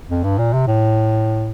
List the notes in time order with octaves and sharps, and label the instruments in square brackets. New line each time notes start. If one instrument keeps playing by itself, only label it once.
[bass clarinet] F2
G2
A#2
C3
A2